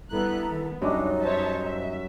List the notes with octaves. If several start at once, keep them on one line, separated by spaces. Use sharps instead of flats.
G2 B3 E4 A4 A#5 F#6
D#3 B3
C#2 F#2 G3 D4 D#4 D#5
C5 C#5 E5 A5
E5